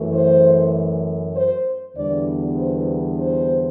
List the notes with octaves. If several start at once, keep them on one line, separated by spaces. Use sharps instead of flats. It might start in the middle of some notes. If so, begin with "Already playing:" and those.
Already playing: F#2 E3 A3
C5
C5
E2 D3 G3 B3 D4 D5
C5
C5